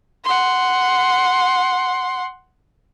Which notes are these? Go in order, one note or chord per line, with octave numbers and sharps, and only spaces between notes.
F#5 C6